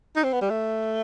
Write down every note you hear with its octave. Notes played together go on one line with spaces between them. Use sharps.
D#4
C4
B3
G3
A3